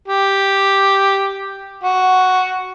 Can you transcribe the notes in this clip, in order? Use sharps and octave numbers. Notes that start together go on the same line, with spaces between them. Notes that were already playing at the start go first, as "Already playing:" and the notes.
G4
F#4